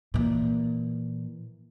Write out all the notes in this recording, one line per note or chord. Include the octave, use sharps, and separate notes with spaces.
A#2 E3